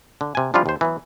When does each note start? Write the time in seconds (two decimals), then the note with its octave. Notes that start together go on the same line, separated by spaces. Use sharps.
0.21 D3
0.35 C3 G#5
0.54 F3 G3 C#4 D4 E4 F4
0.66 D#2 C5
0.81 E3 F#3 B3